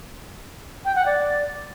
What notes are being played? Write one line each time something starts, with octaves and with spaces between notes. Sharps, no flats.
G5
F#5
D5